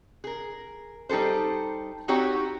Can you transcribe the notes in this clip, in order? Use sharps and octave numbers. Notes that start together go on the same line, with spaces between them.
G#4 A#4
G3 D#4 G4 A4 C5
C4 D#4 F#4 G4 C#5 F#5